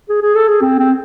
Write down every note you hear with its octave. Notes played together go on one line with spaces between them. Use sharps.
G#4
G#4
A4
G#4
C4
C4